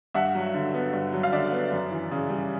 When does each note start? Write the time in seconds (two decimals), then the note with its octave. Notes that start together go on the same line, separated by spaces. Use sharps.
0.14 G2 E5 F#5
0.35 F#3
0.54 D3
0.74 B3
0.93 G2
1.12 F#3
1.23 F5
1.32 D3 D5 E5
1.52 B3
1.72 F#2
1.92 E3
2.11 C#3
2.30 G3